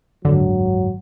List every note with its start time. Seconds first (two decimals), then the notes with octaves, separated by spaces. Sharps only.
0.25 F#1 D#2 G#2 D3 F#3